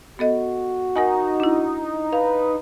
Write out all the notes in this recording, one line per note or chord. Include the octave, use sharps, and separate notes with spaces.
B3 F#4 A4 D#5
D#4 A#4 F#5 G#5
D4 E4
B4 F5